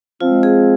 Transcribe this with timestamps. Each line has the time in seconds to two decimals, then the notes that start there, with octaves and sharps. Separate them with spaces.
0.21 F3 G#3 C4 F4
0.43 G#4